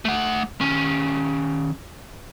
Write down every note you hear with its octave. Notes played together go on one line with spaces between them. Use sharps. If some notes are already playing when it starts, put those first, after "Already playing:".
A3 F#5
D#3 C#4